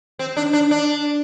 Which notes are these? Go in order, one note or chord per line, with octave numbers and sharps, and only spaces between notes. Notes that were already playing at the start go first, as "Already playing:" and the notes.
C4
D4
D4
D4